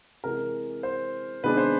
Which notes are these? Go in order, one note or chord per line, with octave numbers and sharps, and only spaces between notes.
C3 E3 G#3 A#4
C5
C3 D#3 G#3 B3 D4 B4
C5